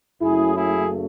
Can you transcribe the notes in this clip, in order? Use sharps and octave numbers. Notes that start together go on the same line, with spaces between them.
F#1 F#2 C#3 F#3 A3 E4 G#4
E4 G#4